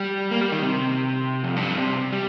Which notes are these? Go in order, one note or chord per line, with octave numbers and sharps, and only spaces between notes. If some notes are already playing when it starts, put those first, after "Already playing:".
Already playing: G3
A#3
G3
D#3
C3
F2
G2
C3
G3